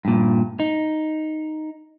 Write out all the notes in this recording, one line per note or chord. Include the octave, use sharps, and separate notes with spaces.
G2 A#2
D#4